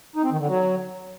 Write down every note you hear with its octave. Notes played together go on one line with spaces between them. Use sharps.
D#4
C4
D#3
D3
F#3